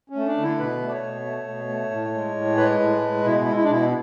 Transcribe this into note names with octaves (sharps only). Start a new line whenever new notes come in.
C#4
A3
D4
D3
E4
B2 B4
A3
D5
C#5
B2
A3
B2
A3
A2
G#3
A2
G#3 B4
A2
G#3
B2 E4
G#3
E4
D4
B2 E4